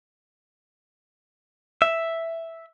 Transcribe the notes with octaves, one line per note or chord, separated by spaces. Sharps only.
E5